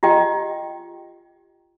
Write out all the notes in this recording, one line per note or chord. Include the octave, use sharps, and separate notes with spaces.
F4 G4 D#5 G5